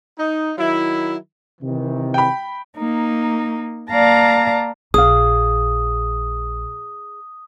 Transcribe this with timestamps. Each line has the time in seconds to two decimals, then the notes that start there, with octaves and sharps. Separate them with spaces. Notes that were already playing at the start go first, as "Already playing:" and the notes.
0.19 D#4
0.58 D#3 F#3 E4
1.62 C3 D#3 E3
2.14 G5 B5
2.77 A#3 D#4
3.90 A#3 D5 F5 A5 A#5 A#6
4.94 A#1 G#4 F5 D#6